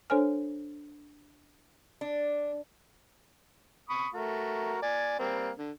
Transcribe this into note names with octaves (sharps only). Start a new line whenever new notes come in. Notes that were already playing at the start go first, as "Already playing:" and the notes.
D4 A4 C5 C#5 G#5 F6
D4
B5 C#6 D#6
A3 F#4 A#4
D5 G#5
G3 A#3 C4
D3